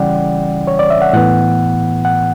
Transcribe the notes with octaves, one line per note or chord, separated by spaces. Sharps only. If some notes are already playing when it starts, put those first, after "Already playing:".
Already playing: C#3 E3 G3 C#4 D5 F#5 G5
C#5
D5
E5
F#5
A2 E3 B3 F#5
F#5